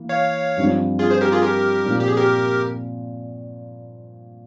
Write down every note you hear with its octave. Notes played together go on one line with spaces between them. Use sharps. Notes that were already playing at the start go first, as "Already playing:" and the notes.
Already playing: E3 A#3
C#5 F5
G2 F3 C4
F4 G#4
G#4 C5
G4 A#4
F4 G#4
G4 A#4
A#2 F3 C4
G4
G#4
G4 A#4